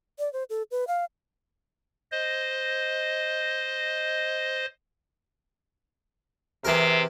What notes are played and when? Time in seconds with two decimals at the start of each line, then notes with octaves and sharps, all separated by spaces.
0.19 D5
0.33 C5
0.50 A4
0.71 B4
0.88 F5
2.11 C5 D#5
6.65 C3 E3 G#4 A#4